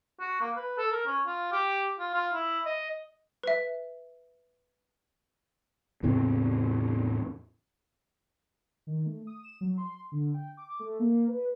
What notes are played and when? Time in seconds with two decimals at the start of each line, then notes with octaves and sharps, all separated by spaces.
0.20 F#4
0.41 A#3
0.56 B4
0.78 A4
0.92 A#4
1.06 C#4
1.27 F4
1.52 G4
1.99 F4
2.14 F4
2.34 E4
2.66 D#5
3.44 B4 E5
6.03 E2 A2 C#3 C4
8.87 D#3
9.06 A3
9.27 D#6
9.43 E7
9.61 F#3
9.77 C6
10.12 D3
10.34 G5
10.57 D6
10.79 A3
10.99 A#3
11.28 B4